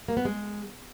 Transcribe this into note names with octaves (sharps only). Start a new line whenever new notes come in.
A#3
B3
G#3